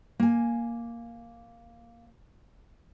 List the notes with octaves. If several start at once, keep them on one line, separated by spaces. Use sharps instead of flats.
A#3 G#5